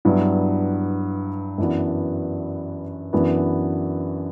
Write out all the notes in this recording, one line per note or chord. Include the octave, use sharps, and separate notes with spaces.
G2 F#3 B3 E4
F#2 E3 B3 D4 F#4
F#2 E3 B3 D4 F#4